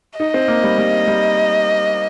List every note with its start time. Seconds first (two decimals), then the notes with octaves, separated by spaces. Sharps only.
0.19 D#4 D#5
0.34 C4
0.48 A#3
0.63 G3
0.78 G3
1.07 G3